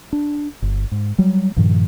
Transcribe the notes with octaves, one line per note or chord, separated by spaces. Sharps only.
D4
G1
G#2
F#3 G3
G2 A#2 D#3 F3